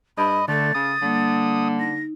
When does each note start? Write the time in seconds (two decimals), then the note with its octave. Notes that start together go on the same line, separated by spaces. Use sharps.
0.18 G2 D#5 B5
0.48 D3 A3 A6
0.75 C#3 D#6
1.02 D3 G3 A#3
1.80 D#4 A#6